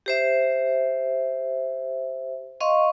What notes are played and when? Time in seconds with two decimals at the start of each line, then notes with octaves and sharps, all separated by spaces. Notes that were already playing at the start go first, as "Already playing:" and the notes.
0.06 G4 C5 E5
2.61 D#5 F5 C6 C#6